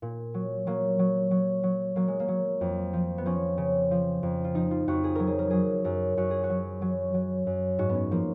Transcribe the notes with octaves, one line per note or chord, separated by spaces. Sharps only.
A#2
F#3
F#3 A#3
F#3
F#3
F#3
F#3 A#3
G#3
A#3
F#3
F2
F3
B3
F3 C#4
C#3
F3
F2
F4
F3 D#4
F4
F2 F#4
G#4
F#3 A#4
G#4
A#4
F#3 G#4
F#2 A#4
F#2 F#4
G#4
F#4
F#3
F#3
F#3
F#2
G#2 F#4
B3
C#4
F3 A#3